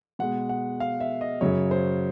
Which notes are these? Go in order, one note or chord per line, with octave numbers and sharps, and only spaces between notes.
B2 G#3 F#5
F#5
F5
E5
D#5
F#2 C#3 F#3 C#5
C5